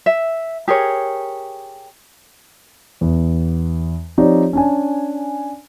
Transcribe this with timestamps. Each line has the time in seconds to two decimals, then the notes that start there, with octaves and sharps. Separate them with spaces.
0.06 E5
0.68 G4 G#4 A#4 C#5
3.01 E2
4.18 F3 C4 D#4 G4 C#5 D5
4.53 C#4 D4 G#5